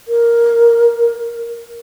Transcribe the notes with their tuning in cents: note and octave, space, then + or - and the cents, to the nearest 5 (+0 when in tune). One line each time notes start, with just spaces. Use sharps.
A#4 +5